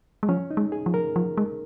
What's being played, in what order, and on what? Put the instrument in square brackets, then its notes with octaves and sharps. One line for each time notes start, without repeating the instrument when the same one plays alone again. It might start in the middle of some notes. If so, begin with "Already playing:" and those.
[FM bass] G#3
[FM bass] F3 [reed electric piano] C#4
[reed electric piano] D#4
[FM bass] G#3
[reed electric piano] G#4
[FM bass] F3
[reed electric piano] A#4
[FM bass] F3
G#3